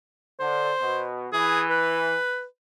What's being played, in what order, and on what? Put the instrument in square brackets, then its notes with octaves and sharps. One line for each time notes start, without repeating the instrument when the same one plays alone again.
[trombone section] D3 [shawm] C5
[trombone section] B2
[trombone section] E3 [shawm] G#4
[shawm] B4